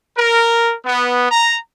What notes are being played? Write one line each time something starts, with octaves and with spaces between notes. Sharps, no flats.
A#4
B3
A#5